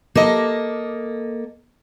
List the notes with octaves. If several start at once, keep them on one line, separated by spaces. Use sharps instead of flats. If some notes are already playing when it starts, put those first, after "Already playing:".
A#3 A4 D#5